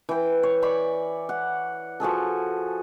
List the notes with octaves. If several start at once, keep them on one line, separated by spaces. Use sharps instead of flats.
E3 G5
C#5
D5 B5 C#6
F#5
F3 F#4 G#4 A4